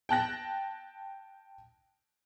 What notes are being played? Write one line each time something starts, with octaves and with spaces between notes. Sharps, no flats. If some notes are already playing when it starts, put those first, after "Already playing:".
G5 A5 F#6 A#6